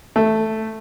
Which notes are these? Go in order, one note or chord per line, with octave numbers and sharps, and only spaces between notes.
A3